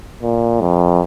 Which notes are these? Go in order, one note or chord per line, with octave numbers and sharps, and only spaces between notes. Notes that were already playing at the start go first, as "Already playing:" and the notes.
A#2
F2